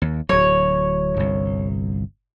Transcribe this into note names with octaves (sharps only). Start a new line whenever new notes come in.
D#2
D1 F#3 C#5
G1 C2